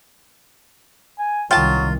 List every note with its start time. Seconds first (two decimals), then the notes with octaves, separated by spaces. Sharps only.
1.19 G#5
1.51 C2 D#3 F#3 F4 G5 A5